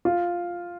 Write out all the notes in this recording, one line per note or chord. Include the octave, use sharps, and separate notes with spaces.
F4